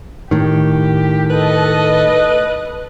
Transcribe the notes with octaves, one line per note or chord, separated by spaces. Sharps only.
A2 D#3 G4
A4 B4 D#5